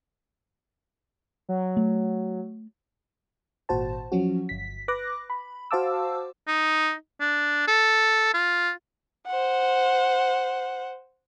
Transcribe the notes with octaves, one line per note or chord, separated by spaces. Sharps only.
F#3
A3
G#1 A#2 F#4 C5 A5
F3 F#3 C#4 F#4
G1 B6
B4 D6 F#6 A#6
B5
F#4 C5 F5 A5 D6 E6
D#4
D4
A4
F4
C5 F#5